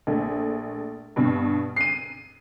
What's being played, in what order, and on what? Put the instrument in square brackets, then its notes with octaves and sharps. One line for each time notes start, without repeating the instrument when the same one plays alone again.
[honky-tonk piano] A#1 A3
G2 B2
C7 D#7